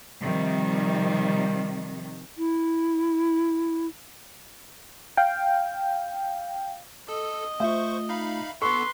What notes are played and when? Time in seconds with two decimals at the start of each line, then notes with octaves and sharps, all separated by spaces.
0.21 C3 D#3 F3 G3
2.35 E4
5.17 F5 G5
7.09 A4 D#5
7.60 A3 F4 C5 E5 C#6
8.09 D#4 F5 B5
8.62 B3 A4 B4 C6 C#6